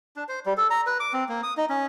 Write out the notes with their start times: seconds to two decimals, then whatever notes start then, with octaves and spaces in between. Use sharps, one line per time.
0.16 D4
0.29 C5
0.46 G3
0.57 A4
0.70 A#5
0.87 B4
1.00 D6
1.14 C4
1.29 A#3
1.43 D#6
1.57 D#4
1.70 C#4